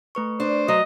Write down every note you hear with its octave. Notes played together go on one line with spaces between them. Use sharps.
A3 B4 C#6
D4 C5
F#3 D#5